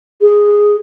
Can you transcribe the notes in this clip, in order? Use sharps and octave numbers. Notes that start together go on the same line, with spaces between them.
G#4